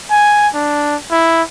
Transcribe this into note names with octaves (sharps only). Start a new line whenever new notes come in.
G#5
D4
E4